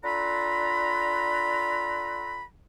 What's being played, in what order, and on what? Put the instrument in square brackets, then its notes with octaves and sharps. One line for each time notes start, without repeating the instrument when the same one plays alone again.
[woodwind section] D4 F4 A4 F#5 A#5 B5